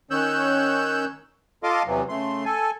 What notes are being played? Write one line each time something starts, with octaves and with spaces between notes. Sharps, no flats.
D#3 C#4 C#5 E6 F#6 G6
F4 A4 D#5 F5 C6 D6
E2 C3 E3 F#3
C#3 A3 C6
A4 G#5